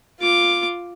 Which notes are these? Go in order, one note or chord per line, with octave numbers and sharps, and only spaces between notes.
F4 D6